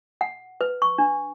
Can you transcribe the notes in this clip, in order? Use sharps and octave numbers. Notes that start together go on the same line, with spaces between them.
F#5
B4
C#6
D4